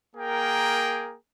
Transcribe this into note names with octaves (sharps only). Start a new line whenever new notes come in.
A#3 G#4 A#4 G5